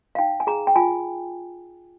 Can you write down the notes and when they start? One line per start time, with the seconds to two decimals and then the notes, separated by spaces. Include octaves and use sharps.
0.15 F5
0.19 D#4 G5
0.40 G#5
0.47 G#4 A#5
0.67 G5
0.76 F4 G#5